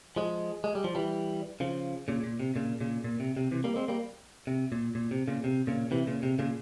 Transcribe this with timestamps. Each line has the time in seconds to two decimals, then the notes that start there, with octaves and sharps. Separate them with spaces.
0.16 F3 G#3
0.64 G#3
0.75 G3
0.84 F3
0.95 E3 G3
1.60 C#3 F3
2.08 A#2 C#3
2.24 A#2
2.40 C3
2.56 A#2 C#3
2.81 A#2 C#3
3.04 A#2
3.20 C3
3.37 C3
3.52 C3 E3
3.64 G3 A#3
3.76 G#3 C4
3.88 G3 A#3
4.47 C3
4.72 A#2
4.95 A#2
5.11 C3
5.28 A#2 C#3
5.44 C3
5.67 A#2 C#3
5.91 C3 E3
6.07 A#2 C#3
6.23 C3
6.39 A#2 C#3